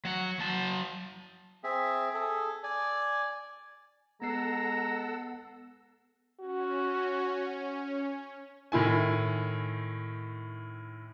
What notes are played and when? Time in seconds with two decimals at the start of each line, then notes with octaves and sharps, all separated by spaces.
0.05 F#3 F#5
0.39 F#3 A5
1.64 C4 G#4 E5
2.14 G#4 A4
2.64 D5 G#5
4.22 G#3 B3 A4 F#5 A#5 E6 C7
6.40 C#4 F#4
8.72 A2 D#3 E4 G#5